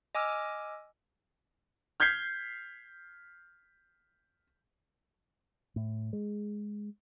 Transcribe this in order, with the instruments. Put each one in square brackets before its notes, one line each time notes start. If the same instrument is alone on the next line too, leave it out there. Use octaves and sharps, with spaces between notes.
[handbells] D#5 G#5 D6 E6 F6
[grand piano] F6 G6 G#6 B6 C7
[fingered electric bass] A2
G#3